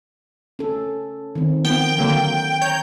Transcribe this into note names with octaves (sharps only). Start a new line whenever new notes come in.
C#4 A4
D#3 C4
F3 B3 G5
D3 F#3 A#3
C#5 A#5 G6